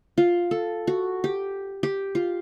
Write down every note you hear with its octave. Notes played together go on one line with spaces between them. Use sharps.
F4
A4
F#4
G4
G4
F4